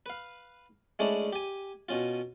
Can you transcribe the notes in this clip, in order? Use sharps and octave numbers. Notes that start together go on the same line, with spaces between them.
B4 F5
G#3 A3 C#4 D4 E4
G4 G#5
B2 C#4 F4